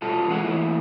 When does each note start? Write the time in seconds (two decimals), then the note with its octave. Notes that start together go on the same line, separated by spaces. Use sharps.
0.02 B2 G3 F4 A4
0.28 E2 G#3 F4 G#4 F#5
0.44 E3 A3 A#3 E4